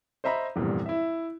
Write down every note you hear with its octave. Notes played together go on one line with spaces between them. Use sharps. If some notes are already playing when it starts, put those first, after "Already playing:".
C5 D#5 E5 A#5 B5
F1 E2 G2 A#2
E4 E5